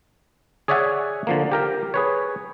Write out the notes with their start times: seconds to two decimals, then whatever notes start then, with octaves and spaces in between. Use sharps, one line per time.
0.68 G#4 C#5 D5 E5 F#5 G#5
1.27 D3 F3 A#3
1.51 G4 A#4 G5
1.94 G#4 B4 C#5